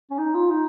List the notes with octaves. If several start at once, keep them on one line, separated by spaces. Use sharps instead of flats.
C#4
D#4
F4
D#4